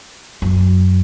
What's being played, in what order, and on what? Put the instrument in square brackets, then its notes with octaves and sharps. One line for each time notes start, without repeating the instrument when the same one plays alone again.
[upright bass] F#2